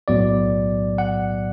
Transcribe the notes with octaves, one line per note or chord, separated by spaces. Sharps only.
B1 A2 F#3 B3 D5
F#5